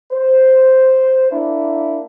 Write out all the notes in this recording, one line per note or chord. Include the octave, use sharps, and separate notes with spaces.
C5
A#3 D4 E4